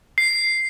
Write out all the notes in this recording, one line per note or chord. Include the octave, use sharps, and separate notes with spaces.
C7